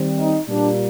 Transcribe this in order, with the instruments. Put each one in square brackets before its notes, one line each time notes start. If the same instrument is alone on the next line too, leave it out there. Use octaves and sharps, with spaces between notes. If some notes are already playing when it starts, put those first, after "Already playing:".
Already playing: [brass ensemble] D#3 G3 C4
D#4
A#2 G3 A#3 D4